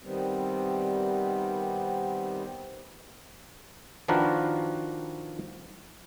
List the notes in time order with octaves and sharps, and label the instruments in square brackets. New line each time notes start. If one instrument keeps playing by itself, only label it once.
[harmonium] C3 D#3 G3 B3 C4
[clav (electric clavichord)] D#3 F3 D4 F#4 A#4 B4